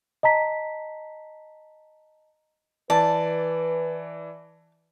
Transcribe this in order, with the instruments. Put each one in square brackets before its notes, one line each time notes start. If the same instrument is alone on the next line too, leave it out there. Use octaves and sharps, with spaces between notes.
[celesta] D#5 A5 A#5 B6
[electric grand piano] E3 D5 [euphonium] B4 [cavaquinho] A5